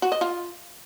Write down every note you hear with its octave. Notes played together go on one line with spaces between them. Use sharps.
F#4
D#5
F4